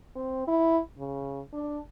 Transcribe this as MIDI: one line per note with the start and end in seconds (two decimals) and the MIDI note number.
0.15 0.47 60
0.47 0.80 64
0.98 1.40 49
1.53 1.78 62